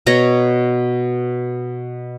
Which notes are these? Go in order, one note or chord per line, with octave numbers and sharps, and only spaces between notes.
B2 C#5 A#5